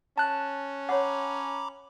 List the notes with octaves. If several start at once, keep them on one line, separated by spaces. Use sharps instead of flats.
C#4 A5 F#6
C#5 F#5 A#5 B5 D6